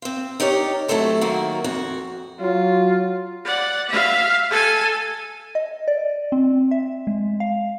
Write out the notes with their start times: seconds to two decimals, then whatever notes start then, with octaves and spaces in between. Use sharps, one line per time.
0.02 C4 F4
0.40 D#4 G4 A#4 C#5 D5
0.88 F#3 A3 C4 E4 A4 C5
1.21 D#3 F#3 A#3 F#4 A#4
1.64 F2 F#4
2.41 F#3 F4
3.45 D5 F#5
3.89 E5 F5
4.51 A4 G#5
5.55 D#5
5.88 D5
6.32 C4
6.71 E5
7.07 G#3
7.40 F5